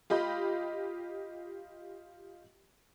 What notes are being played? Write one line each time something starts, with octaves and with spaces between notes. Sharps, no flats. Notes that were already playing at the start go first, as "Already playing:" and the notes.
F4 G4 D#5 B5 G6